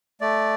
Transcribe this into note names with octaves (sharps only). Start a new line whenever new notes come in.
A3 D5